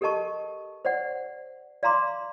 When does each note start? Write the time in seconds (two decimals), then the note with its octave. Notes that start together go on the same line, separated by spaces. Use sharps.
0.01 G4 A4 A#4 D#5 A5 C#6
0.85 C5 D5 F#5
1.83 D5 F5 A#5 C6 D6